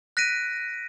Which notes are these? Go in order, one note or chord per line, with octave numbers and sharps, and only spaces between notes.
F#6 A#6 B6 D7 D#7